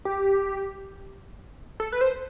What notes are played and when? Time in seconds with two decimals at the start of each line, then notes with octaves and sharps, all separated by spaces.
0.05 G4
1.80 A4
1.92 B4
2.01 C5